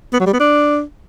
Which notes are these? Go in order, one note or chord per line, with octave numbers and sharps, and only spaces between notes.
B3
F#3
G3
B3
D4